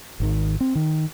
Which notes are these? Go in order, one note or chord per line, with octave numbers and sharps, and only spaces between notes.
G#1 D#3
C4
D#3